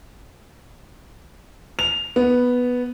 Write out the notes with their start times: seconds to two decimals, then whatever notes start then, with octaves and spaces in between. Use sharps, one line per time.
1.79 F7
2.16 B3